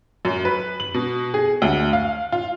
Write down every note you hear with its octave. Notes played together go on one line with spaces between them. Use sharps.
F#2
B4
F#7
B2
G#4
D2
F5
F4